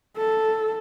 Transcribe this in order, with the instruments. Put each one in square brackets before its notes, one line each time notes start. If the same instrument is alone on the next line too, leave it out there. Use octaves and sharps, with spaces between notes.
[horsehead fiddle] A4